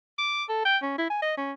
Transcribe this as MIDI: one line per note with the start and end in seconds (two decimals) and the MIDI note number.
0.19 0.44 86
0.49 0.61 69
0.65 0.77 79
0.83 0.97 61
0.98 1.06 64
1.10 1.21 80
1.22 1.35 75
1.37 1.52 61